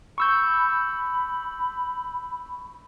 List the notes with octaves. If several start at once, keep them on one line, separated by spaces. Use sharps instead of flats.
B5 C#6 E6 G6